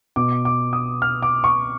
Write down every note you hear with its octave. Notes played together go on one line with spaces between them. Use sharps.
B2 D6
D6
D#6
F6
D6
C#6